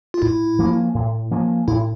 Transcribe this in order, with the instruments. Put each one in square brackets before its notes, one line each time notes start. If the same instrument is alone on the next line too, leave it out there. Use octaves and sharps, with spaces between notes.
[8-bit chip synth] F4
[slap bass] A2 [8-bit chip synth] E4
[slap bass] F3 A#3 C#4
A2
F3 A#3 C#4
[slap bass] A2 [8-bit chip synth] E4